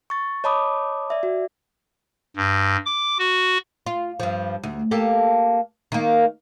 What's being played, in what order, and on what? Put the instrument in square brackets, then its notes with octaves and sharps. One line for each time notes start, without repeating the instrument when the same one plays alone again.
[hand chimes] C#6 A6
C#5 D#5 A5 B5 D6 D#6
D5 E5
F#4
[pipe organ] G2
D6
F#4
[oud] F4
G2 F3
D2
A#3 G4 A4
D#3 A#3